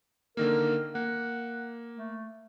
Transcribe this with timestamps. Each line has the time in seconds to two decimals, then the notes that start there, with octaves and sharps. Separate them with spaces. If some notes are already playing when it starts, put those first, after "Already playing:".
0.37 D3 D#3 A#3 A#4
0.95 A#3 F#5
1.94 A3